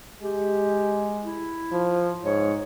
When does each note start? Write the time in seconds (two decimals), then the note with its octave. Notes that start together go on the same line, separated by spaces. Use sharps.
0.22 G#3 G4
1.24 E4
1.72 F3
2.25 G#2 C#5